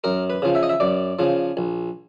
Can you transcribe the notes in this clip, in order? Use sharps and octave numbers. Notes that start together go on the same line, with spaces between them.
F#2 A#4
B4
C#3 F3
E5
D#5
E5
F#2 D5
C#3 F3
A#1